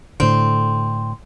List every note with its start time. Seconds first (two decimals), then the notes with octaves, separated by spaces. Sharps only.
0.20 A2 D3 C4